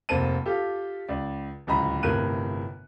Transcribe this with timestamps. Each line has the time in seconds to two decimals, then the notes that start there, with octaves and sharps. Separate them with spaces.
0.09 F1 A#3 C4 A5 D#7
0.46 F4 G4 A4 F5
1.08 C#2 D5
1.67 D1 C#2 D#5 A#5 B5
2.03 G1 A2 C3 A#4 F#6 D#7